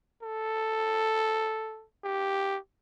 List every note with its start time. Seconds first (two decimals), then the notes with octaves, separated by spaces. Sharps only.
0.23 A4
2.04 G4